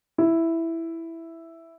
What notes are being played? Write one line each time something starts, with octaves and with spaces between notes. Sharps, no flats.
E4